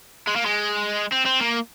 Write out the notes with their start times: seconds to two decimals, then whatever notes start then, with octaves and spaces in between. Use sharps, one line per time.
0.27 G#3
0.36 A#3
0.46 G#3
1.12 C4
1.26 C4
1.41 A#3